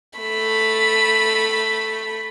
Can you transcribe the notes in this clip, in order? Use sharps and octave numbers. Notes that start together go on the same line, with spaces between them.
A3 B5